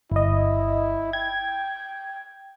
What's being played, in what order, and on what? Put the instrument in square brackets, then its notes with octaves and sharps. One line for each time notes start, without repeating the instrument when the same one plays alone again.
[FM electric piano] G1 D#5 [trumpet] E4
[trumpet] G5 [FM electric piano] G#6